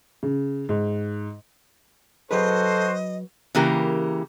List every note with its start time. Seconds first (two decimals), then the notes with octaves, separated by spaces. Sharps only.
0.23 C#3
0.69 G#2
2.31 F#3 F#4 G#4 A4 B4 C5 D#5
3.55 C#3 E3 A#3 G4 A#4